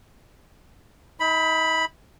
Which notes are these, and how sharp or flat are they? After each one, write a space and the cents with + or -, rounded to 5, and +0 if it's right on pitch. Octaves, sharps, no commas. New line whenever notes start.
D#4 +40 B5 +0